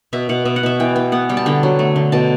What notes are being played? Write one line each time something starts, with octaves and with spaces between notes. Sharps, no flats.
B2 E5
B2 F#5
B2 E5
F#5
B2 E5
E3 G5
E3 G5
B3 F#5
G3 G5
A5
D3 G5
F#3
A3
D3
B2 A5